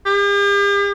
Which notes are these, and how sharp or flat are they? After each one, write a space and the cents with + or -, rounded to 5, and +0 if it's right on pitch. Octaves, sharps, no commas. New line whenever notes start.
G4 +45